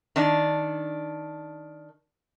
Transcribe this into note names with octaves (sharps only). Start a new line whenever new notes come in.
D#3 D4